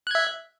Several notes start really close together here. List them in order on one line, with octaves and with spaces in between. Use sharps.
F#6 G#6 E5